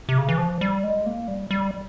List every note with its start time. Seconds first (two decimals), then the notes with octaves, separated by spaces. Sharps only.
0.09 C3
0.18 C#3
0.29 E3
0.38 F3
0.61 G3
0.83 G#3
1.06 A#3
1.28 G3
1.51 G3